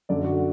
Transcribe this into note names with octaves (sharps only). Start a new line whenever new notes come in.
F#2 D3 D5
F#4